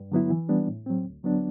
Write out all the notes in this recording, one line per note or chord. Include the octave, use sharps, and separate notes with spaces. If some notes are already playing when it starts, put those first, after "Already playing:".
Already playing: G2
D3 F#3 B3 E4
E3
G3 B3 D4
A2
F#3 C4
D2
D3 F#3 B3 D4